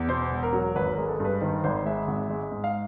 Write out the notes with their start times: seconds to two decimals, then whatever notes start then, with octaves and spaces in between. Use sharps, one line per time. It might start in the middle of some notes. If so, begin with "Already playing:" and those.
Already playing: E2
0.09 B2 C5
0.31 E1
0.43 A#4
0.53 F#3
0.75 G#1 B4
0.92 A#4
0.97 G#3
1.08 A4
1.20 G2 B4
1.41 D#3 C5
1.64 G#1 C5
1.85 G#3 E5
2.07 G#1
2.30 G#3
2.52 G#2
2.64 F5